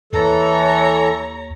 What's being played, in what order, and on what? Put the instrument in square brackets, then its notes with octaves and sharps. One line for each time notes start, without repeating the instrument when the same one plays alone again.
[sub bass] D#2 [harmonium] E3 A4 [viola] C#5 A#5